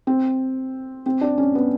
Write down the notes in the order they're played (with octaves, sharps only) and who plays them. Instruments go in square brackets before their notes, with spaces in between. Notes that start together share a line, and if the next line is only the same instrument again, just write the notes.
[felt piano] C4
C4
D4
C#4
B3